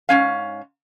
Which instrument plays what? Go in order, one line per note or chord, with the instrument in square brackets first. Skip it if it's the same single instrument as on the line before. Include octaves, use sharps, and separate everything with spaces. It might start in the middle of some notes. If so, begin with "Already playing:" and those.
[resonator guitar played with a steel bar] G#2 D#3 C#4 F5